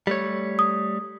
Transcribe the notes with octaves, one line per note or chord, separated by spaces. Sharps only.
G3 A3 C#5
D#6